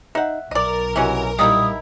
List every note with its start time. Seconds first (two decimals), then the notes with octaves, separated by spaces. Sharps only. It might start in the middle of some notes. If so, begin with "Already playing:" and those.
0.15 D#4 E5 F#5
0.51 B1 A#4 D5 D#5
0.96 C3 E3 G#3 C#4 F#4
1.39 A#2 D#3 G3 D#4 E4 D#6